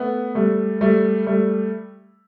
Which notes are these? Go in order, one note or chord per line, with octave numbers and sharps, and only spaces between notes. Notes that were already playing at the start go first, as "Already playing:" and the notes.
Already playing: A3 B3
G3 A3
G3 A3
G3 A3